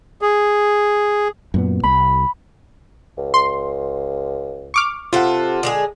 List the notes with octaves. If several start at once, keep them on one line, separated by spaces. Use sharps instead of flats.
G#4
F#2 A#2 B3
C2 B5
C#2
C6
C#6 D6 F6
C3 F4 A4 F#5
D3 G#3 G#4